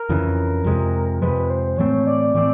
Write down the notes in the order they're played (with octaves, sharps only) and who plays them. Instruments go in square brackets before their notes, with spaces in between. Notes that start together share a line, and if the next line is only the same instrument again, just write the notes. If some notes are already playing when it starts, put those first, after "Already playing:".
Already playing: [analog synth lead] A#4
[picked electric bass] F2 C#3 E3
F2 C3 F3 G#3
[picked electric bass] F2 C3 F3 G#3 [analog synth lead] B4
[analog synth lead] C5
[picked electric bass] A2 E3 A3 C4 [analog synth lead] C#5
[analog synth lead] D5
[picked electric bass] A2 E3 A3 C4 [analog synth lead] D5